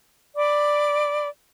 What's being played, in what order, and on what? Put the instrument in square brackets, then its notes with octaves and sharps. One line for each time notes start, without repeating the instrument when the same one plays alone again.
[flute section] D5 B5 D6